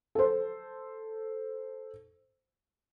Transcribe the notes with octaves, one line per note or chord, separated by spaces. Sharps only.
A4 C5